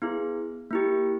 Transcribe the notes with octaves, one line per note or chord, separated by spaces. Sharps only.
B3 E4 G#4
A#3 E4 G4